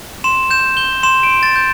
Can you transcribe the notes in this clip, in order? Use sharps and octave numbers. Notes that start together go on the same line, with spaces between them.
C6 E7
G6 E7
G6 G7
C6 E7
D7
C6
A6
G6